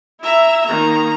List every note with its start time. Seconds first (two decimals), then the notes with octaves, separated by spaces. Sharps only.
0.20 E4 E5 A#5
0.66 D#3 A#3 A#5